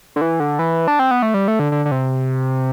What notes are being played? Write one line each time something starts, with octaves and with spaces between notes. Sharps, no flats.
D3
E3
D3
E3
D4
C4
B3
A3
G3
A3
D3
D3
D3
C3